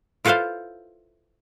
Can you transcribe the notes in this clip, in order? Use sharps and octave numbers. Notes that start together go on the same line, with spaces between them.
E4 F4 A4 B4 C5 F5